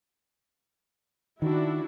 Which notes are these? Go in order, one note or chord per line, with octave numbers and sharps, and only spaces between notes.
D#3 D4 E4 F#4